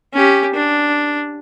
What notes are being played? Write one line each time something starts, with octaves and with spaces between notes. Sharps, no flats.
C#4 G4
D4